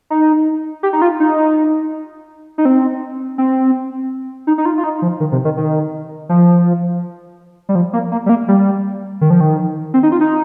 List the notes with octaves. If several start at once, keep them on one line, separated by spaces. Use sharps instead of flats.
D#4
G4
D#4
F4
D#4
D#4
C4
C4
D#4
D#4
F4
F4
D#4
F3
D#3
C3
D#3
D#3
F3
G3
F3
A#3
A#3
G3
A#3
G3
D#3
F3
D#3
C4
D#4
F4
D#4